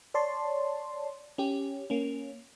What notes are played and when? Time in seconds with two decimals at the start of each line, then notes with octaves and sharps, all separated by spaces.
0.14 C#5 D5 A5 C6
1.38 C#4 G4
1.90 A#3 C#4